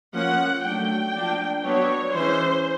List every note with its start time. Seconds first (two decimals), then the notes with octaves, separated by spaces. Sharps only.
0.13 F3 A#3 C#4 F#5
0.64 F#3 A3 D4 G5
1.14 F3 A#3 D4
1.64 F#3 B3 D4 C#5
2.14 E3 G#3 C#4 C5